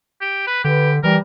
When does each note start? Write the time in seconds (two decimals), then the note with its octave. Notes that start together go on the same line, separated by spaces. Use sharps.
0.21 G4
0.47 B4
0.64 D3 G4 B4
1.03 E3 G3 A#4